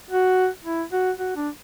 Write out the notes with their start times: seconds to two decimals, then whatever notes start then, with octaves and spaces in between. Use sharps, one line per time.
0.11 F#4
0.64 E4
0.93 F#4
1.19 F#4
1.36 D4